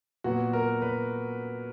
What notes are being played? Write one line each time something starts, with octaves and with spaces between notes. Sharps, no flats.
A#2 F#3 B3 F#4
A#4
B4